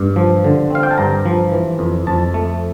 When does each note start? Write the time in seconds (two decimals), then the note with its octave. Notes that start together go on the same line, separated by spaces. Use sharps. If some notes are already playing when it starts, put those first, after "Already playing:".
Already playing: G2
0.16 F3
0.44 D3
0.70 C4 F5
0.83 G5
0.91 A5
0.98 G2 A#5
1.25 F3
1.52 E3
1.79 F2
2.07 F2 A5
2.34 A3